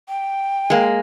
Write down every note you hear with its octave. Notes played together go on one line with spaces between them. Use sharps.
G5
G#3 A#3